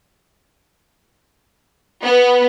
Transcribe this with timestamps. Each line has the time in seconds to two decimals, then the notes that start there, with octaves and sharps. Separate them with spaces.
2.03 B3